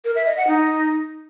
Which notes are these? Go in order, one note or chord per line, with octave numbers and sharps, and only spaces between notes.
A#4
E5
D#5
F#5
D#4